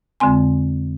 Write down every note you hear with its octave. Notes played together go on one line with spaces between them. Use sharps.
F2 D3 G#3 C4 G#5 C6